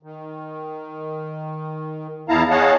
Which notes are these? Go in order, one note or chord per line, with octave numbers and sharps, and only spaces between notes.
D#3
E2 B3 E4 F5 A5 A#5
G#4 C#5 D#5 F5 F#5 A5